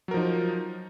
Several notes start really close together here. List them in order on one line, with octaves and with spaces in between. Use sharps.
F#3 A#4 F3 D#4